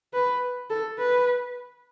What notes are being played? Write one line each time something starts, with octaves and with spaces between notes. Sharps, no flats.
B4
A4
B4